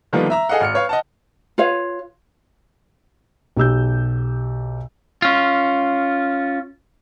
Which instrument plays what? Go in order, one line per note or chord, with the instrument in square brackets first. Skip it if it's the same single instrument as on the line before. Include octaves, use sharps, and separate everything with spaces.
[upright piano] D3 D#3 F3 G3 A#3 B3
E5 A#5 E6
G#4 A4 D#5 F5 F#5
G#1 F6 C#7
B4 C#5 F5
D#5 F#5 A5
[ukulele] F4 B4 C#5 F5
[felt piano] B1 G4 E6 G6
[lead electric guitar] C#4 F4